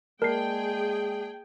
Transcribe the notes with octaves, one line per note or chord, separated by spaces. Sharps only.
G#3 A#3 G#4 A#4 D5 G5 A5 C7